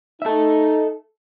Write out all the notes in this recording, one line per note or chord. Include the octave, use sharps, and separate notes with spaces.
D#4 A4 E5